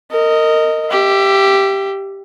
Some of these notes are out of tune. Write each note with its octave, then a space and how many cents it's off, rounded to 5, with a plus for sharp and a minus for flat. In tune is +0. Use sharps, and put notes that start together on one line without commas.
A#4 -25 D#5 +0
G4 +0 E5 +30